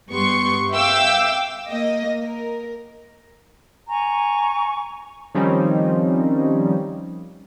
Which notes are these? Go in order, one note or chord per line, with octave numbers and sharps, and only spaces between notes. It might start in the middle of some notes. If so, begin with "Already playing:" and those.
G2 B3 G4 C6 C#6 C#7
E5 F5 G5 D6 E6 G6
A#3 D#5
A#4
G#5 A#5 C#6
D#3 F3 G3 C4 C#4 D#4